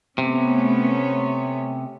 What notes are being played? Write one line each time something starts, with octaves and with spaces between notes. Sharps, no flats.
C3 A3 B3 C#4